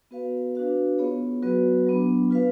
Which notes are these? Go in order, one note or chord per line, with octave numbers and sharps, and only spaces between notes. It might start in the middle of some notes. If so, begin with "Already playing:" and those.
B3 F#4 B4 F5
D4 F#4 B4 F5
B3 F4 G#4 C#5
F#3 B3 F#4 B4
F#3 B3 D4
F4 B4 F5